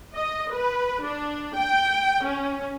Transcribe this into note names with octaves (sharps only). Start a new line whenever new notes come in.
D#5
B4
D4
G5
C#4